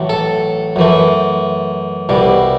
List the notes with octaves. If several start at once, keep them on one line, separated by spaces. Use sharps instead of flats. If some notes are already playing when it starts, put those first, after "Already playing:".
Already playing: A1 A2 F#3 A3
A4
F#2 E3 A3
C2 B2 G3